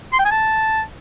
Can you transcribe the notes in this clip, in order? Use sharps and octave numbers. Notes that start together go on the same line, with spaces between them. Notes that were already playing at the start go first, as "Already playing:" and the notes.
C6
G5
G#5
A5